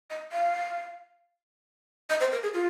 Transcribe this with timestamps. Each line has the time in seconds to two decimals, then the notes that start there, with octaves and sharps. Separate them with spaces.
0.10 D#5
0.32 F5
2.10 D#5
2.20 C5
2.32 A#4
2.43 G#4
2.54 F4